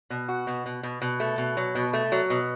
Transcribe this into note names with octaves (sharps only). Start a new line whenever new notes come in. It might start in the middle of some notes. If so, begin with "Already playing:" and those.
B2
F#4
B2
B2
B2
B2
A3
B2
F#3
B2
A3
F#3
B2